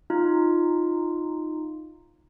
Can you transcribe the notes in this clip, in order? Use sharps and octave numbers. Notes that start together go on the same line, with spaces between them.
D#4 F4